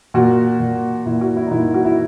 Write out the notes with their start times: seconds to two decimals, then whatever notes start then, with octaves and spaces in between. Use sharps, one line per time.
0.14 A#2 F#4
0.60 A#2
1.06 A#2 E4
1.21 F#4
1.36 E4
1.47 D#4
1.51 A#2 E4
1.74 F#4
1.85 E4